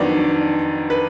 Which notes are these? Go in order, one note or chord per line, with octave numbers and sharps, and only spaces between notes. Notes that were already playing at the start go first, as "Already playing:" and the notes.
Already playing: F2 D#3 F#3 B3 D4 D5
B4